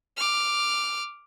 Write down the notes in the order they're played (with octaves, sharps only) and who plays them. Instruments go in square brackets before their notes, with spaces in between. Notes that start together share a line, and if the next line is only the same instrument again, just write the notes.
[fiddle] D6 F6